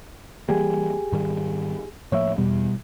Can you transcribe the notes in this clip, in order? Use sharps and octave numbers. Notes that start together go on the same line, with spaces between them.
E3 G3 A#3 G4 G#4 G#5
G#2 D#3 G3
A2 F3 A#3 C#5 E5
E2 B2 G3